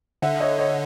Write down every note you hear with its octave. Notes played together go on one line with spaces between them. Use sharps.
D3 E5 F#5
C#5 D#5
C#5 D#5